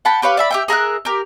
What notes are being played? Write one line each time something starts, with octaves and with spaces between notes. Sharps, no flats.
F#5 G5 A5 B5
G4 B4 C#5 F5
D5 E5 B5
G4 E5 G5
G#4 A#4 E5 F#6
G4 A#4